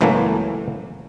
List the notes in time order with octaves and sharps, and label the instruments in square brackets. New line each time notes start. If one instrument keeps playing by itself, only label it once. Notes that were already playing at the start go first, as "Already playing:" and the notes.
[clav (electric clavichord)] C#2 A2 E3 F#3 A3 A#3